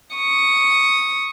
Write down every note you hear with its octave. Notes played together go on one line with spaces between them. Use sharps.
C#6 D#6